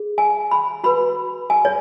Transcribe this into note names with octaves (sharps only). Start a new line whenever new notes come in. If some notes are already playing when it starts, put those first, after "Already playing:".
Already playing: G#4
G#5
B5
F#4 B4 B5
G#5
C#5